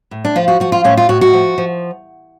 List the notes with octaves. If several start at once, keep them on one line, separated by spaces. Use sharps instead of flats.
A2
D4
F3 F4
F#4
F3 F#4
F4
A2 C#4
F4
A2 F#4
F#4
F3
F3